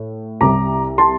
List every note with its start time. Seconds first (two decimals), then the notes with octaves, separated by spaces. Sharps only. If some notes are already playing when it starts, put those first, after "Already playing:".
Already playing: A2
0.41 C2 C3 G3 A#5 D6
0.98 A5 C6